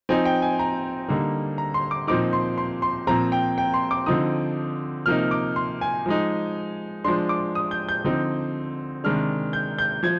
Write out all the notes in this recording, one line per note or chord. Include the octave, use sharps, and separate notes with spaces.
F3 C4 D#4 G#5
G5
G#5
A#5
D3 G3 A#3 D#4
A#5
C6
D6
A#2 F3 C4 D#4 D6
C6
C6
C6
A#2 F3 C4 A#5
G5
G5
C6
D6
D3 F3 C4 D#4 D#6
C3 F3 A#3 D#4 F6
D6
C6
G#5
F3 G#3 D#4
F3 G#3 D4 C6
D6
D#6
G6
G6
D3 F3 C4 D#4
C3 D#3 G#3 D4 F6
G6
G6
F3 G#6